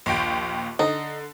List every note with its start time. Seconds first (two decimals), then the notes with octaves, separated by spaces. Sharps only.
0.06 A#1 D#2 G5
0.79 D3 D#4